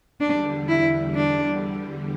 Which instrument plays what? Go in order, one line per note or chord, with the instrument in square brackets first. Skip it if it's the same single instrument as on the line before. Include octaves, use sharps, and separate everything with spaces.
[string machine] E2 D3 G3 [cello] D4
[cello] E4
D4